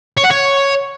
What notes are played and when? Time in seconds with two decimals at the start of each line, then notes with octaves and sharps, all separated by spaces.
0.17 C#5
0.24 F#5
0.30 C#5